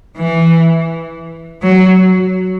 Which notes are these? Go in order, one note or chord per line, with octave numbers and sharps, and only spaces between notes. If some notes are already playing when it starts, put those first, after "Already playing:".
E3
F#3